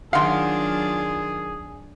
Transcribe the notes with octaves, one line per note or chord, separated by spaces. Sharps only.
D#3 F#3 D4 F4 G#4 F5 F#5 C6